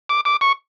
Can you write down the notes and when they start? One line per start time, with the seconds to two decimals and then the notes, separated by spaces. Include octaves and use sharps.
0.09 D6
0.25 D6
0.41 C#6